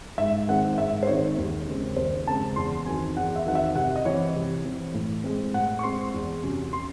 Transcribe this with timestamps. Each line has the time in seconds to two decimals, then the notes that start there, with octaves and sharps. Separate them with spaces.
0.18 G#2 E5
0.48 D#3 G#3 C4 F#5
0.78 G#2 E5
1.03 C5
1.07 D#3 G#3 C4 C#5
1.38 D#2
1.68 C#3 G#3 C4
1.97 D#2 C5
2.27 C#3 G#3 C4 A5
2.56 E2 C6
2.86 D#3 F#3 C4 G#5
3.17 E2 F#5
3.36 E5
3.46 D#3 F#3 C4 F#5
3.55 E5
3.76 C3 F#5
3.96 D#5
4.05 E3 C4 C#5
4.35 C3
4.65 E3 C4
4.94 A2
5.24 G#3 C4
5.54 A2 F#5
5.79 C#6
5.83 G#3 C4 C6
6.14 E2
6.43 C3 F#3 C#4
6.73 C6